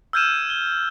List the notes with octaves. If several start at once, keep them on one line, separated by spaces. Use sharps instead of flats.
E6 F6 G6 G#6 D#7 E7
G7